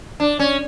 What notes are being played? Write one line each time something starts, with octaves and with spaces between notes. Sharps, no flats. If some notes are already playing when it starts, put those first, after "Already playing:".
D4
C#4